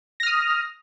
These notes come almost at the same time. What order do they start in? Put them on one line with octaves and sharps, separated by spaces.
A#6 F6 D#6